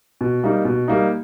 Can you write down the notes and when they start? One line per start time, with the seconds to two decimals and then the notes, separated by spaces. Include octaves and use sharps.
0.21 B2
0.43 G3 A#3 D#4
0.65 B2
0.88 G3 A#3 D#4